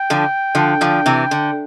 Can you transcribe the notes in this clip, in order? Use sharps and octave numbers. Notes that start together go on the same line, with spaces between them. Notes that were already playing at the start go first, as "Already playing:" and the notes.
Already playing: G5
D3 F3
D3 F3
D3 F3
C3 E3
D3